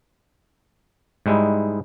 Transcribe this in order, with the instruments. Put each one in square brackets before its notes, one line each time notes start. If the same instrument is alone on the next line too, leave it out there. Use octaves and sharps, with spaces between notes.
[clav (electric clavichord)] G#2 G3 G#3 D#4 E4